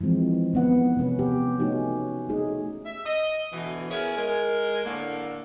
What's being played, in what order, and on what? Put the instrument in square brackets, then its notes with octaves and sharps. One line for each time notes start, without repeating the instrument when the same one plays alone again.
[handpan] E3 F3 G#3 C4
D#3 B3 F#5
C3 C#4 B4
B3 G4
A3 C#4 D#4 F#4 G4
A3 C#4 D#4 G#4
[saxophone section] E5
D#5
D2 B2 E3
B3 C#4 E4 G#4 A#4
G#3 A#4
A2 D3 A#3